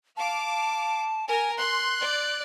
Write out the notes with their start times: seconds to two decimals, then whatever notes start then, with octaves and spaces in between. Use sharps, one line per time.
0.17 F5 A5 D6
1.28 A#4 G#5
1.58 C6 F#6
2.01 D5